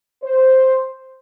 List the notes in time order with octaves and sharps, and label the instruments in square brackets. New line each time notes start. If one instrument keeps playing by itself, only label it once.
[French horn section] C5